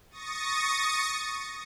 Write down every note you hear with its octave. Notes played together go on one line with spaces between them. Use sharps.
C#6 D#6 A6 A#6 C#7